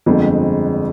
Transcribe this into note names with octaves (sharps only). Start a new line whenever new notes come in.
G1 F2 D3 G#3 C4